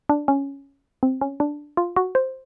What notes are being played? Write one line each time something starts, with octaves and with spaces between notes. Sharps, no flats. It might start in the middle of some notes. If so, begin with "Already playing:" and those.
D4
C#4
C4
C#4
D4
F4
F#4
C5